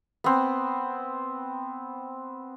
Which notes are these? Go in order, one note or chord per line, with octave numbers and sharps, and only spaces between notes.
B3 C4